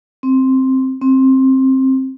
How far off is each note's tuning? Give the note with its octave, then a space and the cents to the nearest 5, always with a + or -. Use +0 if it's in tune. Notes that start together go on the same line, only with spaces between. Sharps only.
C4 +5
C4 +15